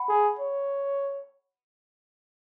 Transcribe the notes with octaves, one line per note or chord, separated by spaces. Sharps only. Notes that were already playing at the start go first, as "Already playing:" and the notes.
Already playing: F#5 B5
G#4
C#5